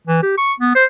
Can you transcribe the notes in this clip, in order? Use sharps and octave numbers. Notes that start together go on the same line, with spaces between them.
E3
G4
C#6
B3
C5